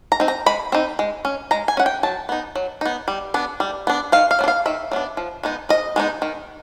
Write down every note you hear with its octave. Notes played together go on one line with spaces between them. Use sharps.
A#5
C4 D#4
A#5
G#3 B5
C4 D#4
G#3
C#4
G#3 A#5
G#5
C#4 F#5
G5
F#3 A5
B3 D#4
F#3
B3 D#4
G3
B3 D4
G3
B3 D4
D#3 F5
F5
F#3 B3 D4
F5
D#3 E5
F#3 B3 D4
F3
G#3 B3 D#4
F3 D#5
G#3 B3 D#4
D#3